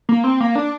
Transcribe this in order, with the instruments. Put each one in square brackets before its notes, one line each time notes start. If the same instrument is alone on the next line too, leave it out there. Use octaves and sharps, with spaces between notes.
[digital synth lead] A#3
C4
A#3
D4